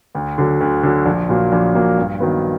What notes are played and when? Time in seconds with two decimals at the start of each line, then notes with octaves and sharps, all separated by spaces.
0.15 D2
0.38 D3 F#3
0.61 D2
0.83 D3 F#3
1.06 A#1
1.29 A#2 F#3 A#3
1.52 A#1
1.75 A#2 F#3 A#3
1.98 G2
2.20 D#3 F#3 B3